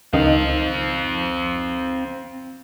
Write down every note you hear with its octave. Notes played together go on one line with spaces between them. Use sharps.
C#2 D#3 C4 D#4 F5